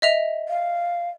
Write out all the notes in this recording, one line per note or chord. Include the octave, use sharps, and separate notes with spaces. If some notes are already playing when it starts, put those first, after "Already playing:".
D#5 E5 F7
F5